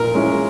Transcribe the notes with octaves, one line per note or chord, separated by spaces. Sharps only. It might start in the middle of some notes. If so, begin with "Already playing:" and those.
Already playing: A#2 A#4
G#3 C#4 E4